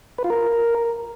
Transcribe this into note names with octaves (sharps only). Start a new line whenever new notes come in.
B4
F4
A#4